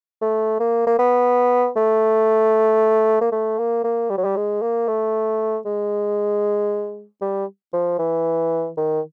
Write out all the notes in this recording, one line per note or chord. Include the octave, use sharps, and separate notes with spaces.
A3
A#3
A#3
B3
A3
A#3
A3
A#3
A#3
G3
F#3
G3
G#3
A#3
A3
G#3
G3
F3
E3
D#3